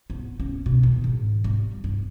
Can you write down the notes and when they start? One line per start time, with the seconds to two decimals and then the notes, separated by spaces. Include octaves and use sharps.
0.10 B3
0.40 C#4
0.66 B2
0.83 D#3
1.04 G#2
1.44 G3
1.84 G2